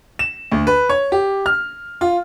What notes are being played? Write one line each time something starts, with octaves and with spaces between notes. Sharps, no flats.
E7
D2
B4
C#5
G4
F6
F4